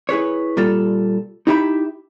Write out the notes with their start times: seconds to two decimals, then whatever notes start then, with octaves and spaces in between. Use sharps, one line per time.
0.09 E4 G#4 B4 C#5
0.57 A#2 G3 F4 A4
1.47 D#4 E4 G4 E5 G5 B5